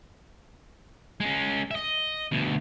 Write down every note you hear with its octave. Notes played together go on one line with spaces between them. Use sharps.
G#3 C#4
D#5 E5
D2 B2